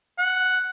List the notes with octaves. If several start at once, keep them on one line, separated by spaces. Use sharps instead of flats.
F#5